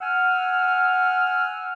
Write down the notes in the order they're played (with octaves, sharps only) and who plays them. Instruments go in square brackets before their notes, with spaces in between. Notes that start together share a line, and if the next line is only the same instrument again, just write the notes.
[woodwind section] F#5 G#5 E6 F6